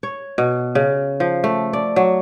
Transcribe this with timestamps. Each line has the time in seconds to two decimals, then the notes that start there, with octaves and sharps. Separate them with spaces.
0.03 C#5
0.38 B2
0.75 C#3
1.20 F3
1.44 A3
1.73 D5
1.96 F#3